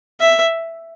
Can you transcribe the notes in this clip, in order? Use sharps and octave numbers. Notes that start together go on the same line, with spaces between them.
E5